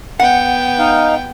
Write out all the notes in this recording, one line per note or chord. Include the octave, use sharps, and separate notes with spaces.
B3 F#5 G5
D#4 F5